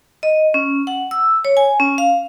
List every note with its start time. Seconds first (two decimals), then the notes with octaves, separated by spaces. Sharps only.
0.23 D#5
0.54 C#4
0.87 F#5
1.11 E6
1.45 C#5
1.57 G#5
1.80 C#4
1.98 F5